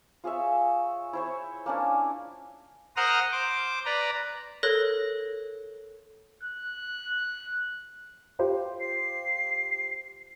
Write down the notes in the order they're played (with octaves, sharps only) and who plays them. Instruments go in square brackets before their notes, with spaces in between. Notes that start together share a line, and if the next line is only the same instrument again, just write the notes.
[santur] F4 G#4 C#5 E5
E4 C5 C#5
A#3 C#4 D4
[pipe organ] A#4 C5 F#5 A#5 D#6 F6
C5 D6
B4 D5 A#5
[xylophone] A4 A#4 C#5 F#6 A#6
[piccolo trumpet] F#6
[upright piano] F4 G4 C5
[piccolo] C7